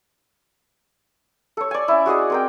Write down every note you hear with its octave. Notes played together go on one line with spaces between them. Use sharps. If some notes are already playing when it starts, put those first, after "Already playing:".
A4 C#5
D5 G#5
C#4 E4
F#4 G#4 D5 D#5
C4 A#4 G5